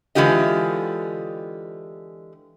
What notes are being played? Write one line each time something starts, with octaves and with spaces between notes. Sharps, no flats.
D3 E3 G#3 F4 G4 D#5